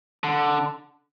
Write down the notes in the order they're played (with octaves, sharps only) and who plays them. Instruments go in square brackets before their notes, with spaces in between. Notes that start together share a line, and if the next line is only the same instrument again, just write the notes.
[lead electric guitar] D3